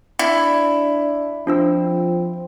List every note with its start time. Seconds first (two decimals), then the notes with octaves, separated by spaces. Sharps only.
0.19 D4 E4
1.47 F3 C4 D4 F4 E6